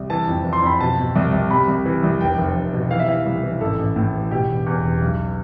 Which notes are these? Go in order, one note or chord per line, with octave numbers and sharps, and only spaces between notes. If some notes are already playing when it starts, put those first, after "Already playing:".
Already playing: C2
E3 A5
F2
E3
C6
F2 B5
B2 A5
B2
C2
C2
C3 B5
C2
E3
C2
F1 G5
F1
F1
B2
E3 F5
E5
E3 F5
C2
E3
A1 A4
A1
A2
E3
B2 G4
E1
E2
E1
B1